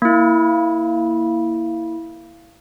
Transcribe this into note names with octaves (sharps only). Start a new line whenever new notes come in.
A#3 E4